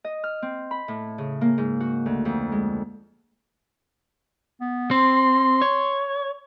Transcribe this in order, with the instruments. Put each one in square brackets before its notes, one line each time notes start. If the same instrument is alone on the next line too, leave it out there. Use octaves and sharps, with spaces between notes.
[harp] D#5
F6
C4
B5
A2
C#3
A#3
G#2
F#4
D2
F2
G#3
[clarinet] B3
[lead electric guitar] C4 [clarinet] C6
[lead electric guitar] C#5